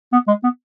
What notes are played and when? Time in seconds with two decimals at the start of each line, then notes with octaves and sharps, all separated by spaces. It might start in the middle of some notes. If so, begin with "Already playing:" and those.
0.12 B3
0.27 G#3
0.43 B3